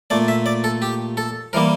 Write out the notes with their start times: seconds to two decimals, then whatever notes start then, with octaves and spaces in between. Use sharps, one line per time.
0.10 A#2 A3 D5
0.28 E5
0.46 D5
0.64 A4
0.82 G4
1.17 A4
1.53 E3 G3 A#3 A#4